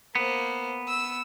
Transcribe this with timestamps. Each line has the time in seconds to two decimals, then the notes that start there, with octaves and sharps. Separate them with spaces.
0.15 A#3 B3 C5
0.88 E6